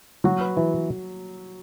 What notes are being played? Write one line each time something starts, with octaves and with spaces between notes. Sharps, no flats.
F#3 F#4
B4
E3